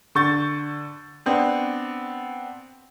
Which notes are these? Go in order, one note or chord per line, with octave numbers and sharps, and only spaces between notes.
D3 C#6 G6 A6
B3 C4 D4